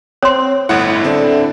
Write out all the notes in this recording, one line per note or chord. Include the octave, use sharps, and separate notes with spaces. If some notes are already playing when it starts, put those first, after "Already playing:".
C4 C#5 C6
G1 A2 E4 F#5
D3 C4